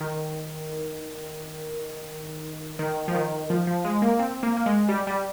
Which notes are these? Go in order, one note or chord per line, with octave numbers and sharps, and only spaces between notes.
D#3
D#3
F3
D#3
F3
F3
G#3
A#3
C4
A#3
A#3
G#3
G3
G3